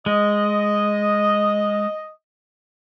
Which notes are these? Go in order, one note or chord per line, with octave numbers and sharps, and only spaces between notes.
G#3 D#5